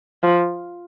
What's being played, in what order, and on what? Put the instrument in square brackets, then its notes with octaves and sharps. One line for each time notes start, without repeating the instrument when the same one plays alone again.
[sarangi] F3